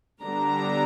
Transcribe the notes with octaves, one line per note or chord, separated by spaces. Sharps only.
D3 G3 B3 D4 A#5